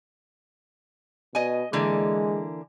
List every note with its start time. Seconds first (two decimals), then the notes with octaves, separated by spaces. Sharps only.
1.35 B2 D#5 G#5
1.73 D3 E3 G#3 A#3